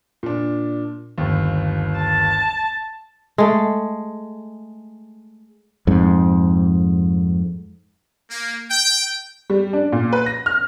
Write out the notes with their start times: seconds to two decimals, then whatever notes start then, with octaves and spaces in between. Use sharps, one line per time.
0.23 A#2 D4
1.18 G1 D#2
1.98 A5
3.38 G#3 A3
5.87 F2 G#2
8.30 A#3
8.70 G5
9.50 G3
9.73 D4
9.92 A#2
10.13 B4
10.26 A#6
10.46 F6